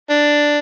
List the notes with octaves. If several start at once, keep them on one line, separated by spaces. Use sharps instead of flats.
D4